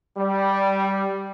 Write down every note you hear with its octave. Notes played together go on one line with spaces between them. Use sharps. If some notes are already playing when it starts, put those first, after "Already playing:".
G3